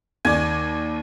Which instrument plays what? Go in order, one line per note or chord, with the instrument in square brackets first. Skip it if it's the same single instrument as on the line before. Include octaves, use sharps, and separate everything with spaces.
[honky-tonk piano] D#2 D5 [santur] G#5